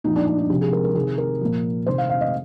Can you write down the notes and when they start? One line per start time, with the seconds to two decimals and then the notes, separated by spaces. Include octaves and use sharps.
0.04 A#2 F3 D#4
0.16 D4
0.27 D4
0.38 D#4
0.50 C3 F3 G4
0.61 G#4
0.72 A#4
0.84 A#4
0.95 C3 D#3 G#4
1.18 A#4
1.41 A#2 F3
1.86 C3 D#3 C5
1.98 F5
2.10 F5
2.21 D#5